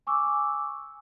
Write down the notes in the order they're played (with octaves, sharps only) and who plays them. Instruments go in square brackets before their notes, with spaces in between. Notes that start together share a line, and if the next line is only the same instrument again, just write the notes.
[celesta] G#5 C#6 D6 E6